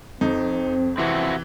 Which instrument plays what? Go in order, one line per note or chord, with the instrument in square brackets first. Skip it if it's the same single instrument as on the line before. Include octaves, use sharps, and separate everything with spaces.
[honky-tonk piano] F2 [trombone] C4 [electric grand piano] D#4
[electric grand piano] C3 E3 [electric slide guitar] C4 E4 F#4